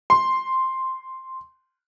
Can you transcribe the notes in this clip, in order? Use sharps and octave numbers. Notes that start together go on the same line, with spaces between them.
C6